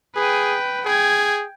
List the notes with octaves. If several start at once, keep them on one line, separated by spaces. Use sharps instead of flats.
G#4 B4 G5
G#4 G5 G#6